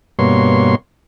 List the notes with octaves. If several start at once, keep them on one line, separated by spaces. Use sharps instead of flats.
G2 B2 A#3 C#5 C6